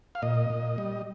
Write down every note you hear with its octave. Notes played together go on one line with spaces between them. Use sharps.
F5
A#2 D#5
A#2
G3